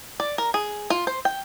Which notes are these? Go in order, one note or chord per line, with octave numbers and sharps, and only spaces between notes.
D5
A#4
G#4
F4
C5
G5